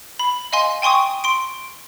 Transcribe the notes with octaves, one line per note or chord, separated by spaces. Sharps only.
B5
D#5 F5 G#5 C6
G5 G#5 C6 C#6 D#6
C6 D7